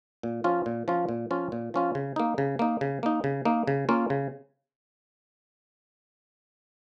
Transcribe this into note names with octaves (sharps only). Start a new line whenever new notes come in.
A#2
F3 C#4 F4
A#2
F3 C#4 F4
A#2
F3 C#4 F4
A#2
F3 C#4 F4
C#3
A#3 D#4
C#3
A#3 D#4
C#3
A#3 D#4
C#3
A#3 D#4
C#3
A#3 C#4 F4
C#3